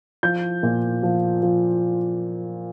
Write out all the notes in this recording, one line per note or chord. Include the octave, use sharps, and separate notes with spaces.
F3 G6
A#2
F3
F3